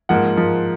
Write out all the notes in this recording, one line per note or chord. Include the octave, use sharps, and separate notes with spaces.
G#2 F3 A#3 F#5
G#2 F3 A#3